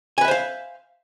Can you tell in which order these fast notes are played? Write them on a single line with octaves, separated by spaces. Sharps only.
G#5 B4 E5 C5 F5